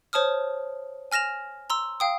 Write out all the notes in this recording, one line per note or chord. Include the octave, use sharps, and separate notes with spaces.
C5 C#5 A5 D#6 F6
G#5 F6 A#6 E7 F7
A#5 C6 E6
F5 G5 D#6